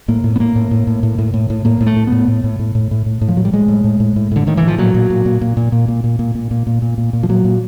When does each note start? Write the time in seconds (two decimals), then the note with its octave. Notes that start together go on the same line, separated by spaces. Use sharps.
0.08 A2 A#3
0.24 A2
0.36 B3
0.40 A2 A#3
0.56 A2
0.71 A2
0.87 A2
1.03 A2
1.18 A2
1.34 A2
1.50 A2
1.65 A2 A#3
1.81 A2
1.86 A3
1.96 A2
2.07 A2 B3
2.28 A2
2.44 A2
2.59 A2
2.75 A2
2.91 A2
3.06 A2
3.21 A2
3.28 F3
3.37 A2 F#3
3.45 G3
3.53 A2 G#3
3.68 A2
3.84 A2
4.00 A2
4.16 A2
4.31 A2 D3
4.47 A2 D#3
4.57 E3
4.63 A2 F3
4.78 A#2 F#3
4.94 A#2
5.10 A#2
5.25 A#2
5.41 A#2
5.57 A#2
5.72 A#2
5.88 A#2
6.04 A#2
6.19 A#2
6.35 A#2
6.51 A#2
6.67 A#2
6.82 A#2
6.98 A#2
7.13 A#2
7.23 F3
7.29 A#2 F#3
7.45 A#2